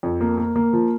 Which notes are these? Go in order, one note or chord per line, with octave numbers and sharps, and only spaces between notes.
F2
A#3
A#3
A#3
F3